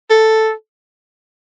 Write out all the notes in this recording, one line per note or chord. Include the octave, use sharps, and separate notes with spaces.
A4